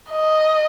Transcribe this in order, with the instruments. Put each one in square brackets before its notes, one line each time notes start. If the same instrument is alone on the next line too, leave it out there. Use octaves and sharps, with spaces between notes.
[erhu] D#5